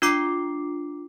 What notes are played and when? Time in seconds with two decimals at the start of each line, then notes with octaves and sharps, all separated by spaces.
0.02 D4 F4 D6 C7